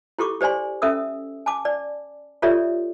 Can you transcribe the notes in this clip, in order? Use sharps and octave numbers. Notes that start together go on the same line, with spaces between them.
E4 G4 A4 C#6 D6
G4 C5 D5 G#5 C6
C#4 A4 E5 D#6 E6
G#5 A5 D6
D5
F4 G4 A4 C#5 D5 E5